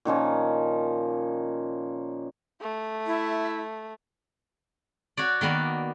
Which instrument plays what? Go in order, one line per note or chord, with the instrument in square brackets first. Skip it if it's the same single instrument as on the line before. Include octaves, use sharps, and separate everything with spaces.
[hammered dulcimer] A#2 D#3 F3 C#4
[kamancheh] A3
[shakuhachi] E4
[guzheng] F#4 C#5 D5
D#3 A#3 B3 D5